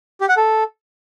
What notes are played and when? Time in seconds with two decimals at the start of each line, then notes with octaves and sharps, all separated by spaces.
0.21 G4
0.29 F#5
0.37 A4